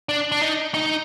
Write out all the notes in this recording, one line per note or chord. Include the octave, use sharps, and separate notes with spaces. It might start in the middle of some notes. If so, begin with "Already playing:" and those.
D4
D4
D#4
D#4